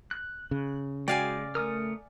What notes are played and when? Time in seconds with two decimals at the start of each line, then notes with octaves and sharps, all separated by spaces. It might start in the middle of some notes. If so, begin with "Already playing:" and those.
0.11 F#6
0.51 C#3
1.08 G#3 F#4 D5 F5 G5 G#5
1.55 A3 A#4 D#6 F6